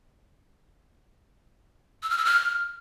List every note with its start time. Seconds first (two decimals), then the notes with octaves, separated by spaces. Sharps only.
2.03 E6
2.10 F6
2.18 E6
2.25 F6